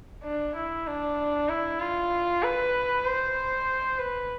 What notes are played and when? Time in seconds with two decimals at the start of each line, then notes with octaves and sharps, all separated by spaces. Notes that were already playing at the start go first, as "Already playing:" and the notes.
0.23 D4
0.55 E4
0.87 D4
1.49 E4
1.80 F4
2.43 B4
3.05 C5
3.98 B4